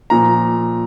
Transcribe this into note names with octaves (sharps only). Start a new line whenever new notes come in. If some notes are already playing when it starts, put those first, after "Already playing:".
A#2 F3 A#5